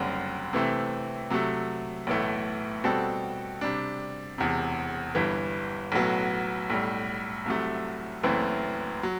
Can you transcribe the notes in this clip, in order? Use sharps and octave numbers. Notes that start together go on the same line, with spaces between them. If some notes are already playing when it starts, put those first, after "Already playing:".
Already playing: F#1 F#2 D3 G3 C4
C3 E3 A3 C4
C3 F#3 A3
B1 A2 E3 A3
B2 G3 C4 F#4 A4
C3 G3 D4
E1 E2 C3
G1 G2 E3
B1 A2 F#3 B3
B1 A2 G3
C2 C3 F#3 A3
F#1 F#2 E3 A3 C4
F#3